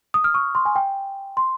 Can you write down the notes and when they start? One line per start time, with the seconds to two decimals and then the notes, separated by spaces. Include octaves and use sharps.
0.14 D#6
0.24 F6
0.34 C#6
0.55 C6
0.65 G#5
0.76 G5
1.37 C6